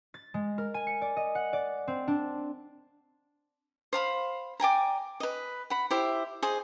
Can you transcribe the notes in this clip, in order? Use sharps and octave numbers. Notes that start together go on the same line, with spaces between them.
A6
G#3
A#4
G#5
C#7
D5
D#5
F#5
D5
C4
D4
C5 F5 B5
D5 G5 G#5 A#5
B4 D#5
F#5 B5
E4 G4 C5 E5
G#4 C5 D#5